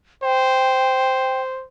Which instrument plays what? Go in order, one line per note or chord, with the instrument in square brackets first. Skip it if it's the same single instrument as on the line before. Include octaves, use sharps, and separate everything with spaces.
[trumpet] C5 [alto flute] G5